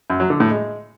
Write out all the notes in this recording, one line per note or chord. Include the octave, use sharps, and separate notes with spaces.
F#2
F#3
D3
A2
G#3